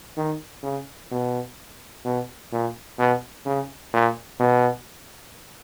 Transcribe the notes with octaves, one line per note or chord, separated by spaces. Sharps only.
D#3
C#3
B2
B2
A#2
B2
C#3
A#2
B2